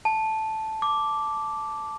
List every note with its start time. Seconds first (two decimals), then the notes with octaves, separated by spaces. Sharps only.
0.05 A5
0.82 D6